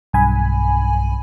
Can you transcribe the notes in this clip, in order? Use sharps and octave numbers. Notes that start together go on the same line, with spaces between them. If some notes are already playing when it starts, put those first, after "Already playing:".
B1 G2 G#5 B5